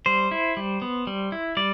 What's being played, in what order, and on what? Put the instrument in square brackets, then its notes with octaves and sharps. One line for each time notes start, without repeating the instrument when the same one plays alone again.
[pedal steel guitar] G3 C5
E4
G3
B3
G3
E4
G3 D5